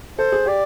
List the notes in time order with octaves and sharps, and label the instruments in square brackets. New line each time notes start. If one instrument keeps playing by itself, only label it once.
[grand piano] A4 [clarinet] C5
[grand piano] G#4
[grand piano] G4 [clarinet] D5